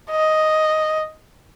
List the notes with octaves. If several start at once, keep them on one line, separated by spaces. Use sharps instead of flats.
D#5